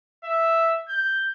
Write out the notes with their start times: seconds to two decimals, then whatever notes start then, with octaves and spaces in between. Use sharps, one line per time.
0.24 E5
0.89 G6